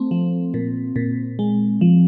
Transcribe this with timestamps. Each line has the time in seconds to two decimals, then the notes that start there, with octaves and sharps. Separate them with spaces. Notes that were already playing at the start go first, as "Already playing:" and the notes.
Already playing: A3 C4
0.11 F3
0.54 A#2
0.96 A#2
1.39 G#3
1.81 F3